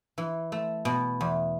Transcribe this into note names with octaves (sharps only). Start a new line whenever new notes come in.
E3
A3
B2
E2